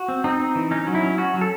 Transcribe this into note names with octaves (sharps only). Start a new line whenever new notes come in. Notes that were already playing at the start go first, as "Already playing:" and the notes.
Already playing: F#4
C4
C4 D#4
C4
E3
C#4 D#4
F#3
E4
C#4
C#4 F#4
F#3
A4